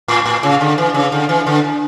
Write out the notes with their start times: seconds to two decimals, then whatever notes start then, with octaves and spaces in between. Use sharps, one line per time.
0.08 A2
0.26 A2
0.43 C#3
0.61 D3
0.78 E3
0.94 C#3
1.12 D3
1.29 E3
1.47 D3